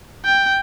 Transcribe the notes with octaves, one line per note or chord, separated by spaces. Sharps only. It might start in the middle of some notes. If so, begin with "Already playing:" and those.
G5